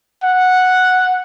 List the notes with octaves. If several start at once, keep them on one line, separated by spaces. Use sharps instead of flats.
F#5